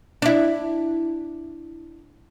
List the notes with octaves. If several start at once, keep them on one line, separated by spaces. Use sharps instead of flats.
D4 E4